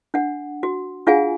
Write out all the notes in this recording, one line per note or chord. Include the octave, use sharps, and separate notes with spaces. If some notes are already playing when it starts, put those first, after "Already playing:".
D4 F#5
F#4
D4 F4 G#4 F5 F#5 G#5